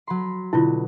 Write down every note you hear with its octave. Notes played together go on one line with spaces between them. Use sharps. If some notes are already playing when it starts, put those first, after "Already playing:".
F#3 B5 C6
B2 D3 E4 F4